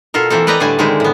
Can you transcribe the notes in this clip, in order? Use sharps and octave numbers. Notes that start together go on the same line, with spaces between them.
B2 F4 A4 A#4
E3 A#3 C4 A4
B4 D5 D#5 G5 A#5
A2 D3 G3 A3 G#5 A5
D3 D#3 G#3 C4 E4
A2 B3